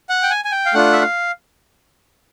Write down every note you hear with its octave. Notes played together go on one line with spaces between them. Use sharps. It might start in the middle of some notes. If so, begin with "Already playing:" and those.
F#5
G5
G#5
G#5
G5
F5
A3 D4 F4 F#5
E5
F5